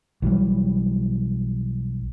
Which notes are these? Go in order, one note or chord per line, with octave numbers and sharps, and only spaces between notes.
B1 E3 F#3 G3